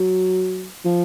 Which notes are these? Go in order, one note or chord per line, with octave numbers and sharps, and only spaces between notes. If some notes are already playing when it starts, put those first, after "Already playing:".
Already playing: F#3
F3